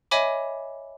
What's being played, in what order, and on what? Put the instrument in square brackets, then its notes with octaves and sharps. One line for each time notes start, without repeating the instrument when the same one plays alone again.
[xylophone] C#5 D#5 E5 G#5 B5 D6